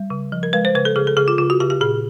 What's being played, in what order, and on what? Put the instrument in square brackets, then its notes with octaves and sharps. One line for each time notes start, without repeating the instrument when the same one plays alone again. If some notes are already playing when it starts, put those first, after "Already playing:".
Already playing: [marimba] G3
C#3
F3
A#4
G#3 B4
C5
C#3 B4
A4
C#3 G#4
A4
C#3 G#4
F4
C#3 F4
F#4
C#3 G4
G4
A#2 G#4